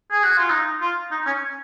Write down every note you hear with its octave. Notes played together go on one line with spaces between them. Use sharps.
G#4
F#4
F4
D#4
F4
D#4
C#4